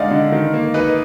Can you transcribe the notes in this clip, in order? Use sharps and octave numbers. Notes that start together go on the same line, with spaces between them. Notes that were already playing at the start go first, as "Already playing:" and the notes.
Already playing: D3 G#3 D#4 D5 D#5 F5 F#5
D3
D#3
A#3
D#4 B4 D#5